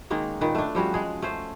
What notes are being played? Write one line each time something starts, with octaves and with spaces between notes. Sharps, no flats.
D#3 G#3 A#3 C#4
A#2 D#3 B4
A3 D4
F3 G3 C#4 F#4
G#3 G#4
A3 C#4 C5